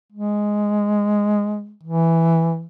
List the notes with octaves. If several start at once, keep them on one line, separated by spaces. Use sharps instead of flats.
G#3
E3